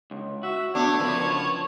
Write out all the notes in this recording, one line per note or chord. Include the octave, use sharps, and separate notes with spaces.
C#2
F#4 E5
B2 A3 D4 C#5
C#3 F3 A#4 B4